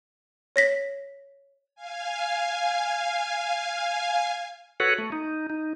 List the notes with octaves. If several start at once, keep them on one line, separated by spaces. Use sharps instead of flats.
C#5 A#6 B6
F5 G#5
F#4 A4 B4 C#5 F#5
A3
D#4
D#4